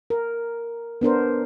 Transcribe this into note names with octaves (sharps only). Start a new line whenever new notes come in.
A#4
B3 D4 A#4 C5